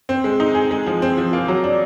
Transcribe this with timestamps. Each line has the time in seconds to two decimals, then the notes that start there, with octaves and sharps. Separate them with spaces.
0.09 C4
0.24 G#3
0.40 D#4
0.55 G#4
0.71 G#3
0.87 F3
1.02 C4
1.18 F3
1.33 A#3
1.48 F#3
1.64 D4